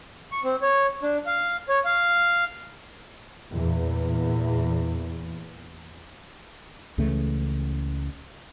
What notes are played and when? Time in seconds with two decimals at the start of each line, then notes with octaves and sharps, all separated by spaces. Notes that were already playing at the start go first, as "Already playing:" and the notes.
0.32 C#6
0.44 C4
0.62 C#5
1.03 D4
1.26 F5
1.69 C#5
1.85 F5
3.51 E2 A#2
6.98 C#2 C#3 E3 A3